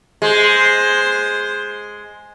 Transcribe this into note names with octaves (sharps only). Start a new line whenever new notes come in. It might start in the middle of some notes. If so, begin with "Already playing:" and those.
G#3 C5